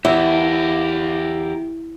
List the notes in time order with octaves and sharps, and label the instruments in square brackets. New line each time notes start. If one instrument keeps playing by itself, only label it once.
[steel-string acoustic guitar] E2 [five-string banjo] E4 [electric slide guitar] G4 A#4